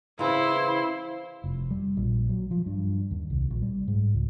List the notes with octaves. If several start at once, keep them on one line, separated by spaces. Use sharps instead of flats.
C#3 E3 E4 C5 F5 C6
F1
G3
A#1
F#3
F3
G2
D#2
C2
A#1
G3
G#2
C#2